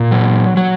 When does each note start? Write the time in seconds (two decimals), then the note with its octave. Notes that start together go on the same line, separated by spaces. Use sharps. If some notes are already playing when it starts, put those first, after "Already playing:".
Already playing: A#2
0.11 F#3
0.57 F#3